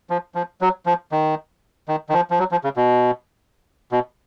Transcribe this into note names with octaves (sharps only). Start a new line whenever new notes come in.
F3
F3
F#3
F3
D#3
D#3
D#3
F3
F3
F#3
F3
C#3
B2
B2